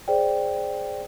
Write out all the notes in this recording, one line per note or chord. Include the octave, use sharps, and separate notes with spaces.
G#4 C5 D5 G5